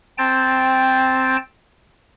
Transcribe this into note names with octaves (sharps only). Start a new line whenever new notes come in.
C4 G5 A5